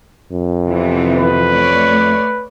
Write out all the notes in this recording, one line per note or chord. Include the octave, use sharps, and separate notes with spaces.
F2
C3 E3 B3
B4
A3 C#5 D5